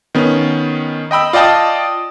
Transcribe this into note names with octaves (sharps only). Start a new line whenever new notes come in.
D#3 B3 C#4
D#5 G5 B5 E6
F4 D5 D#5 G5 A5 D#6